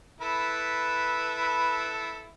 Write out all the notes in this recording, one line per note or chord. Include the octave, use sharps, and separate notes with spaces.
E4 A4 B4